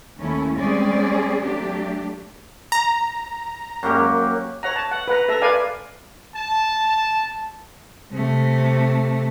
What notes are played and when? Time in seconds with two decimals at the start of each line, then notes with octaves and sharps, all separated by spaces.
0.19 D#2 A3 C#4 E4
0.58 G3 G#3 C4 C#4 G#4 D5
1.42 F#3 A3 D4 G4
2.72 A#5
3.83 F#2 A#3 G4
4.63 C#5 F#5 A#5
4.76 A5
4.91 F#5
5.08 B4 F#5 A#5
5.28 A4 E5 A#5
5.42 A#4 B4 D5 F5 G#5
6.35 A5
8.12 C3 A3